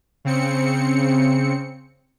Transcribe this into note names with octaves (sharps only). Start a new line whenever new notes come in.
C#3 C4 C#7